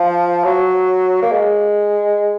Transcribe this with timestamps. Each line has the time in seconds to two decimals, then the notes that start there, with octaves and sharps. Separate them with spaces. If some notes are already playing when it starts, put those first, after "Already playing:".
Already playing: F3
0.44 F#3
1.22 A#3
1.31 G#3